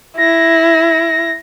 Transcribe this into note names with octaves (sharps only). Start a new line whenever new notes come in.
E4 A#6